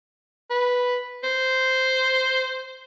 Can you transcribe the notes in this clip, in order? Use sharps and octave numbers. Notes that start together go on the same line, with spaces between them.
B4
C5